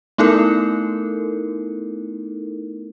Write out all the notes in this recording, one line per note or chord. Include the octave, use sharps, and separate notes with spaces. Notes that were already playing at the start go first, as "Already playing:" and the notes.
A3 B3 D#4 E4 A4 A#4